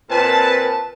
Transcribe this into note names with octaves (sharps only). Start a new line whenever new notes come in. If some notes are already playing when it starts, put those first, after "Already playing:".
A#2 C4 A#4 B4 A5